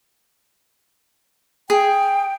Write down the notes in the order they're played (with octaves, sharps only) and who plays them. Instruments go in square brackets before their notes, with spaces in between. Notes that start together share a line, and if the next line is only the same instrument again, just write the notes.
[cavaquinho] G#4 [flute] G5